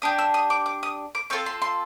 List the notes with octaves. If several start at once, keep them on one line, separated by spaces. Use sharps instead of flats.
D4 G4 D#6
E6
D#6
D6
D6
D#6
D6
C4 F4 A4 C#6
C6
C6